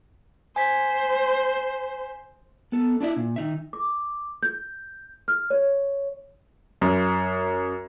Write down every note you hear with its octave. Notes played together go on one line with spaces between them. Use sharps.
C5 G#5 B6
B3 A4
D4 E4 D5 E5
A#2
D#3 D#4 E5
D6
G6
F6
C#5
F#2